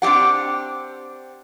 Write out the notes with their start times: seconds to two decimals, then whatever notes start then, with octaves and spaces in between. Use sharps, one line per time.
0.02 C4 D4 D#4 G4 F#5